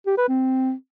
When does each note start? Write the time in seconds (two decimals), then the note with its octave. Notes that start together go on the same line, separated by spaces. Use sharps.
0.06 G4
0.18 B4
0.29 C4